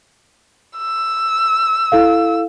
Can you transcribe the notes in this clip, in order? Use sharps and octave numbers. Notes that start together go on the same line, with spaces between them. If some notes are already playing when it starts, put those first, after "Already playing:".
E6
E4 A4 F5